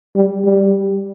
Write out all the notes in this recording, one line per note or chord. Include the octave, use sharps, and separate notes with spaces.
G3
G3